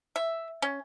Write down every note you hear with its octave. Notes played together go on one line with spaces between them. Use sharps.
E5
C#4